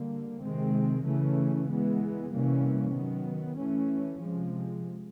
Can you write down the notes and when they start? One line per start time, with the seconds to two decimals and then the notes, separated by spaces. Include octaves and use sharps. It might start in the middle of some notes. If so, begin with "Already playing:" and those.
Already playing: D3 G3 A#3
0.41 C3 D#3 G#3 C4
1.05 C#3 E3 A3 C#4
1.68 E3 G#3 B3
2.31 C3 E3 G3 A#3 C#4
2.94 D#3 F#3 B3
3.57 E3 A3 C#4
4.20 C3 F3 G#3